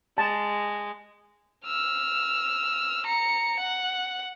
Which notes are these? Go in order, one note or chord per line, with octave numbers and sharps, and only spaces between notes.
G#3 A5
E6 F6
A#5 C#7
F#5